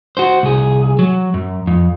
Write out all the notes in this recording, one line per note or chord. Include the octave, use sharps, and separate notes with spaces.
F#4 C5
C2 G#4
F#3
F#2
F2